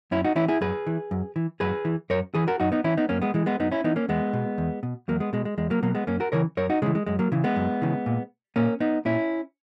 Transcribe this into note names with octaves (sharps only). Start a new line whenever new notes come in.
F#2 C#4 E4
D#4 F#4
E3 C#4 E4
E4 G#4
F#2 G#4 B4
E3
F#2
E3
F#2 G#4 B4
E3
F#2 A#4 C#5
E3 G#4 B4
F#4 A#4
F#2 D#4 F#4
B3 D#4
E3 C#4 E4
B3 D#4
F#2 A#3 C#4
G#3 B3
E3 G#3
G#3 B3
F#2 B3 D#4
C#4 E4
E3 B3 D#4
A#3 C#4
E2 G#3 B3
B2
E2
B2
E2 F#3 A#3
G#3 B3
B2 G#3
G#3
E2 G#3
F#3 A#3
B2 F#3 A#3
G#3 B3
F#2 A#3 C#4
F#4 A#4
C#3 E3 A#4 C#5
F#2 A#4 C#5
D#4 F#4
C#3 E3 G#3
G#3
F#2 G#3
F#3 A#3
C#3 E3
G#3 B3
F#2
C#3 E3
A#2
A#2 A#3 C#4
B3 D#4
A#2 C#4 E4